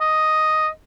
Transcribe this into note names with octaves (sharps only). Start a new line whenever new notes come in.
D#5